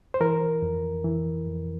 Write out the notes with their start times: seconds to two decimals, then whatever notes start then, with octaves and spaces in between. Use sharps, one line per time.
0.14 C5
0.21 E3 A#4
0.62 F2
1.05 E3
1.47 F2